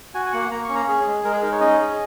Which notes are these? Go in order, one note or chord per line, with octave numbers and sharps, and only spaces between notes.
F#4 G#5
G#5
A#3 F#5
A#3 A#5
C#6
C#4
A#5
G#4
G#3
G#3 A#4
G#4
D#4 A#4
C#5
C#4 D#5
G#4